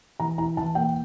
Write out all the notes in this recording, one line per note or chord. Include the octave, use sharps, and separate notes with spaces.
E3 A#5
E4 A#5
E3 A5
A#3 G5